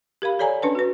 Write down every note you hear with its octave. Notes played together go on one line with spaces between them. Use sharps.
G4 A#4 F5 B5
A4 C#5 D5 G#5 A#5
C#4 D4 B4 A5
F#4 B4